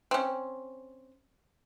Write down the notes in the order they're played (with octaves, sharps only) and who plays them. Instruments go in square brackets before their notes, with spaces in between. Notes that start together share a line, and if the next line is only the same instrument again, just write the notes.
[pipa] C4 C#4